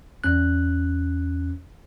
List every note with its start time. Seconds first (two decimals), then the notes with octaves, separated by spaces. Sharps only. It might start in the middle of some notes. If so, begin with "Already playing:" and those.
0.24 E2 C#4 F#6